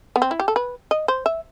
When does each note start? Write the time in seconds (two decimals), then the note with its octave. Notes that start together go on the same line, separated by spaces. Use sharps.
0.16 B3
0.22 C4
0.31 E4
0.40 G4
0.48 A4
0.56 B4
0.91 D#5
1.08 C5
1.26 E5